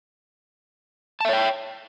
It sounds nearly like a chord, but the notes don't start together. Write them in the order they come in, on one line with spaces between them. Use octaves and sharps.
A5 E5 C#5 G5